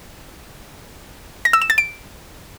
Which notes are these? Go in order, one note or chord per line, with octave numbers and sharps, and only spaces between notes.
A#6
E6
E7
A6
D7